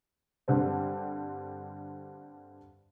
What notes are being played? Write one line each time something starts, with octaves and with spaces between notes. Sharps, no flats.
G2 D3 G3 C4